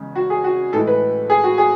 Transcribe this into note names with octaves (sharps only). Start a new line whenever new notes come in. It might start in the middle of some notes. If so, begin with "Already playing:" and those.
Already playing: E2 C#3 G#3
F#4
G#4
F#4
A2 E3 G#3 A4
B4
G#4
F#4
G#4